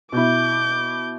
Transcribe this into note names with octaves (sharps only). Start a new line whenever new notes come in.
B2 E4 D6 G6